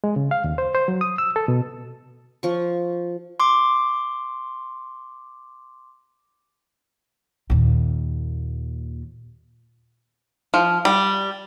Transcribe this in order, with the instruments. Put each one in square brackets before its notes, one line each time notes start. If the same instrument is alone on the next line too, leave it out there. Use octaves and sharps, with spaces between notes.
[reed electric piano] G#3
C#3
F5
D#2
C5
C5
F#3
D#6
E6
A4
B2
[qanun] F3 C#6
[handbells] C6 D6
[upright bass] D#2 A#2
[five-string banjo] F3
G3